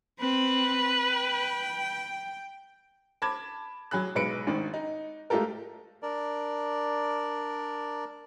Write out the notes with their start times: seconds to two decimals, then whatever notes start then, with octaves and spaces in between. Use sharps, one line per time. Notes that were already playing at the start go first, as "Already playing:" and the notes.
0.20 C4 B4
1.13 G5
3.22 A5 B5 D6 G#6
3.91 F#3 G#4 B5 F#6
4.15 B1 G#3 B4 C#7 D7
4.47 G#1 D#3
4.74 D#4
5.30 G#3 A3 F4 G4 A4 A#4
6.02 D4 A#4 D5